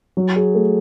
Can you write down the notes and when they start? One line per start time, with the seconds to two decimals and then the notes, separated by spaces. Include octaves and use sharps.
0.17 F#3
0.36 G#4
0.55 A3